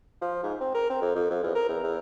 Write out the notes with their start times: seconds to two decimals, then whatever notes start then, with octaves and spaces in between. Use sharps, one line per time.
0.21 F3
0.43 G#2
0.60 C4
0.74 A#4
0.90 C4
1.01 F2
1.15 F2
1.30 F2
1.43 E2
1.55 A#4
1.69 E2
1.83 E2